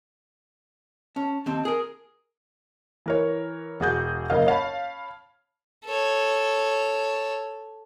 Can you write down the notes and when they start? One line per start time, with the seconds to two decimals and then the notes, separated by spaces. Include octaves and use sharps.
1.16 C#4 A5
1.46 D#2 C4
1.65 G#4 A#4 D#6
3.06 E3 A#4 C#5
3.80 E1 F#4 G#4 G6
4.30 F#1 C#3 A#4 D#5 F5
4.46 C#5 F5 A5 B5
5.85 A4 C#5